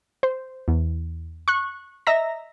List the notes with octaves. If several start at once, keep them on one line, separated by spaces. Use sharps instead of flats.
C5
E2
C#6 F#6
D#5 E5 A#5 A#6